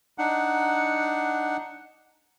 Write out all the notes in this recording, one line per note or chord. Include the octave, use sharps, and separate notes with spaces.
D4 D#4 F#5